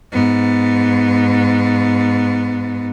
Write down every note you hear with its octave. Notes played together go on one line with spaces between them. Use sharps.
G#2 B3